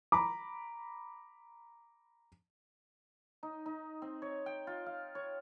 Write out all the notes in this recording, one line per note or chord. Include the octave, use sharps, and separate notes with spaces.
A#5 B5 D6
D#4
D#4
C4
C#5
G5
F4
F5
C#5